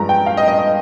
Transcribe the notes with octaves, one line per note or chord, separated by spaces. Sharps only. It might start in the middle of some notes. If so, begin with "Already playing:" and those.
Already playing: G2 F3 G#3 A#5
G5
F5
D#5
D#5
D#5